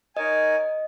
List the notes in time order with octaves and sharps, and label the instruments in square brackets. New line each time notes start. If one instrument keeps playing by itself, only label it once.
[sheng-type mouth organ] D#4 A#4 C#5 G#5 [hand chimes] D#5